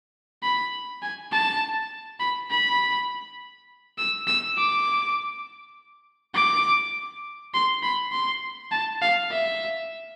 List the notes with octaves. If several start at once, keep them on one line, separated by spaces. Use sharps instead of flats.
B5
G#5
A5
B5
B5
E6
E6
D6
D6
C6
B5
C6
A5
F5
E5